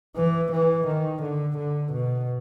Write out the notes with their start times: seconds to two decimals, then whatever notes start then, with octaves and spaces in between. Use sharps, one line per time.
0.16 E3
0.52 E3
0.86 D#3
1.21 D3
1.57 D3
1.92 B2